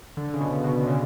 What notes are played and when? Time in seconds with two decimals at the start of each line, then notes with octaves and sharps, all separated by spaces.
0.17 D3
0.34 C#3
0.40 B2
0.64 B2
0.83 D3
0.87 C#3